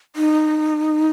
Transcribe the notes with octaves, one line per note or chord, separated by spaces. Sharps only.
D#4